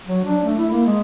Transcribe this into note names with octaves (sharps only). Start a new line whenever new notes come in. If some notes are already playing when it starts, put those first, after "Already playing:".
F#3
D4
A3
E4
A#3
G#3